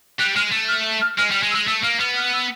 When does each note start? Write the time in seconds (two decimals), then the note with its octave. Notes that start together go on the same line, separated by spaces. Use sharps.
0.19 G3 F#6
0.36 G#3 F6
0.52 A3
0.68 F6
1.01 F6
1.18 G#3 F6
1.31 G3 F6
1.43 G#3
1.51 E6
1.55 G#3
1.67 A3 E6
1.84 A#3 F6
2.00 B3 F6
2.17 F6
2.33 E6